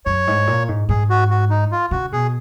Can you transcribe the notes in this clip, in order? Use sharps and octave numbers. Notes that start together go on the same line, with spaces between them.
F#2 C#5
G#2
A#2
G#2
G#2 G#4
F#4
F#4
D#4
F4
C#3 F#4
B2 G#4